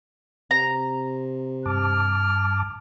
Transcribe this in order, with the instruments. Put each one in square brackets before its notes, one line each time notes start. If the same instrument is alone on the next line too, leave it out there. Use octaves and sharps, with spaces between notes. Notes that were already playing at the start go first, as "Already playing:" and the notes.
[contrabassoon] C3 [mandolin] A#5
[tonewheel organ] G2 A5 D6 [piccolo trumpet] F6